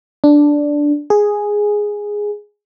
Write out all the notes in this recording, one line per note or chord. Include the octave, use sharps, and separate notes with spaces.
D4
G#4